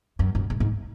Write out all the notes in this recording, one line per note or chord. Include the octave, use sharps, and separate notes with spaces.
F#2
F#2
G#2
G#2